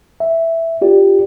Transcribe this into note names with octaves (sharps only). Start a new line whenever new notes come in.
E5
F4 G4 D5